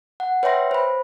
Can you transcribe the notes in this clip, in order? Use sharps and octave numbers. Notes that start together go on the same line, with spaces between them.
F#5
B4 C#5 E5 G5 C6 A#6
C5 B5